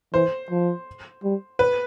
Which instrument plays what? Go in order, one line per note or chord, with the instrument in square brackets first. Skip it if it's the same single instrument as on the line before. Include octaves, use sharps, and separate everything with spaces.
[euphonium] E3 [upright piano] C5
[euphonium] F3
G3
[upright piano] B4